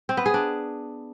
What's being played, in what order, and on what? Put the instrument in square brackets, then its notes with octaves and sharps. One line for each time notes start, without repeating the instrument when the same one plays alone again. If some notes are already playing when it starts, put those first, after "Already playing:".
[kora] C4
B3
G#4
D4